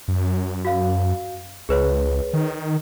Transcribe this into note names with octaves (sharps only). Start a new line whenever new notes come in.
F#2
F#4 F5
C#2 G#4 B4 C#5
D#3